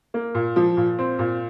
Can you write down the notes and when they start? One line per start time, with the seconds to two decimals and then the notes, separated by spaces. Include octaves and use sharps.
0.14 A#3
0.35 A#2
0.56 F3
0.77 A#2
0.99 C4
1.19 A#2